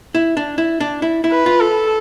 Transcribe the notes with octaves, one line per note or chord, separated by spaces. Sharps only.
E4
D4
E4
D4
E4
E4
B4
F4
A4